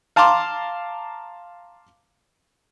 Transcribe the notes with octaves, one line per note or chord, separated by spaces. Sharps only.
F5 A5 A#5 C6 D6